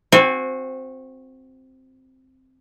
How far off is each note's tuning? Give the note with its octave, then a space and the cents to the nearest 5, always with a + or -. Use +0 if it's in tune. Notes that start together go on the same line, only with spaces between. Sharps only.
C4 +0 F#4 -25 G#5 -25